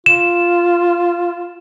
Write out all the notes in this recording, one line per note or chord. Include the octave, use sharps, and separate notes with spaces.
F4 E7